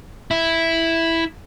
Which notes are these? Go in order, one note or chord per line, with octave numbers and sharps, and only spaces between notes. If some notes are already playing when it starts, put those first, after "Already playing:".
E4